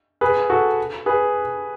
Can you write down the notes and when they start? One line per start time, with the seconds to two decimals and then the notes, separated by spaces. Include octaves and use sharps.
0.21 G#4 B4
0.50 F#4 A4
1.06 G#4 B4